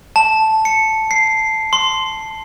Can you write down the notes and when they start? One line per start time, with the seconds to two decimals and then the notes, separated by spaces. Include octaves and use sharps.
0.16 A5
0.65 C#7
1.11 C7
1.73 C6